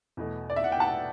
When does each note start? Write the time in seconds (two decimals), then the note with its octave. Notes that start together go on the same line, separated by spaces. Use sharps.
0.17 E2 B2 A3
0.50 D5
0.56 E5
0.64 F#5
0.72 G5
0.80 F#5 A5